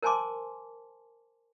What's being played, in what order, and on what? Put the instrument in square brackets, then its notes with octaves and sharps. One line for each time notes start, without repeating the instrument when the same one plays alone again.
[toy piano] A#4 C5 G#5 A5 C6 D6